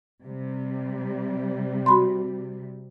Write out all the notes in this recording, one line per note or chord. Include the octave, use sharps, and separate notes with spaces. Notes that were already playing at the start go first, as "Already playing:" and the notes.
C3 G3
F#4 B5 C6